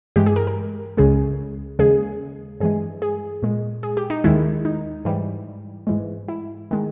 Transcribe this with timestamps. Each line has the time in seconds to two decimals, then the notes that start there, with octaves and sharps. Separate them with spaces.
0.16 G2 E3 G#3 G4
0.26 G#4
0.36 A#4
0.47 A#4
0.97 C#2 C#3 G#3 G#4
1.79 D#2 C#3 G#3 G#4
2.60 G2 E3 G#3 G#4
3.02 G#4
3.43 A#2 G#3
3.83 G#4
3.97 G4
4.10 D#4
4.24 D#2 D#3 G#3 E4
4.65 D#4
5.05 G#2 E3 G3
5.87 G#2 E3 G#3
6.28 E4
6.71 D#3 G#3